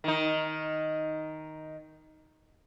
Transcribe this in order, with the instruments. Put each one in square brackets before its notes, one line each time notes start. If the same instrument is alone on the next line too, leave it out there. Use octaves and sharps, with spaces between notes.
[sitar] D#3 D#4